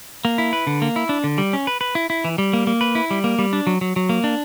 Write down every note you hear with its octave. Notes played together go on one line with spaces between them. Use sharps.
A#3
E4
B4
D3
A#3
E4
D4
D3
G3
C#4
B4
B4
E4
E4
E3
G3
A#3
A#3
B4
E4
G3
A#3
G3
D4
F#3
F#3
F#3
A#3
D4